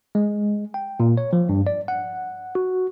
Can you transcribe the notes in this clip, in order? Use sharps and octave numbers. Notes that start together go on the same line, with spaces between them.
G#3
G5
A#2
C#5
F3
G2
D5
F#5
F#4